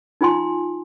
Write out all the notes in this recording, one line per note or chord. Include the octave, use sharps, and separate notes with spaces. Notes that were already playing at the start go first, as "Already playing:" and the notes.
D#4 F4 G#5 C6